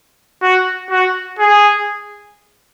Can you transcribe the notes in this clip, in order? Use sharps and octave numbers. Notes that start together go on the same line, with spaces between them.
F#4
F#4
G#4